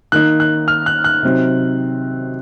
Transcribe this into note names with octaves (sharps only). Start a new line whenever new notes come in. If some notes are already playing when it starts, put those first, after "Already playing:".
D#3 A#3 D#4 F#6
F#6
F6
F#6
F#6
C3 F#3 C4 D#4